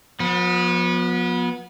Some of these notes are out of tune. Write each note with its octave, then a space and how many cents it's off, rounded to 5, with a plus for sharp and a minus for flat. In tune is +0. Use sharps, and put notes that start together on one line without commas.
F3 +35 B3 -25